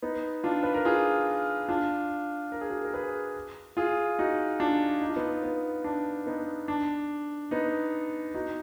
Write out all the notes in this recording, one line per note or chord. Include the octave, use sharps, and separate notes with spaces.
B3 D#4
D4 F4
B4
A#4
F4 G#4
D4 F4
A#4
G#4
F#4 A#4
A#4
G#4 B4
F4 G#4
D#4 F#4
D4 F4
D#4
F4
B3 D#4
B3
D4
B3 D#4
D4
B3 D#4
D#4 F#4